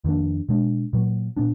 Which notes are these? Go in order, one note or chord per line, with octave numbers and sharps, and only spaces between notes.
F2 D#3 A#3 D4
B2 G#3 D4
A#2 F#3 A#3
A#2 B3 D4